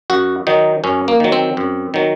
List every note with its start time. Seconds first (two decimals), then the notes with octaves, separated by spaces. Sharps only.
0.10 F#2 F#4
0.47 D#3 F#3 D#4
0.84 F#2 C#4
1.08 A#3
1.20 D#3 F#3
1.32 C4
1.57 F#2
1.94 D#3 F#3